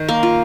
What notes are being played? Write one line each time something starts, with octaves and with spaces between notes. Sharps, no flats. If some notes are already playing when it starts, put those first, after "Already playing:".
Already playing: D#3
A#3
F4